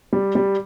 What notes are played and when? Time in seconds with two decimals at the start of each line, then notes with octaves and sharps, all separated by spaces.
0.13 G3
0.35 G3